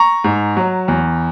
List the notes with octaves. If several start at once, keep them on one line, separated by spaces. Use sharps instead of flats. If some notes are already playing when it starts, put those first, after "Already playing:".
Already playing: A#5 C#6
G#2
F#3
E2